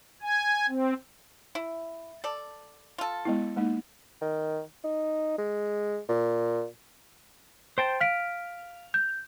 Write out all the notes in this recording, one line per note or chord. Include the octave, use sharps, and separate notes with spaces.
G#5
C4
E4
A4 D5
F4 A4
G#3 B3 E4
G#3 A#3 D#4
D#3
D#4
G#3
A#2
C5 G5 A5
F5 F6 B6 D7
G6